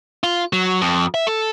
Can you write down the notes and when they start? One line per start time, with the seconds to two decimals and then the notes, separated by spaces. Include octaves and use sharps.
0.24 F4
0.53 F#3
0.81 F2
1.14 E5
1.27 A4